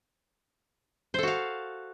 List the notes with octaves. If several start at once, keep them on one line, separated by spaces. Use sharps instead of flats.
F#4 A4 C5 F5